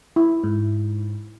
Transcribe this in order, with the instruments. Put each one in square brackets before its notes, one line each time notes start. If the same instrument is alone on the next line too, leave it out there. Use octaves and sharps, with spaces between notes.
[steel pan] E4
[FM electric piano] G#2